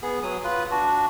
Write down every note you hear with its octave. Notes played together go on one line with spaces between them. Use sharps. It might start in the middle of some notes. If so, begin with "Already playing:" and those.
B3 G#4
F#3 D#6
F4 B4
D4 F#4